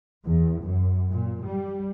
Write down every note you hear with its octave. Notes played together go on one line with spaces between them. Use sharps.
E2
F#2
A#2
G3